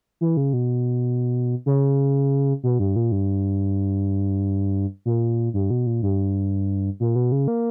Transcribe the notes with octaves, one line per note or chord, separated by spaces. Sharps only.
E3
C#3
B2
C#3
B2
G2
A#2
G2
A#2
G2
B2
A#2
G2
A#2
B2
C#3
A#3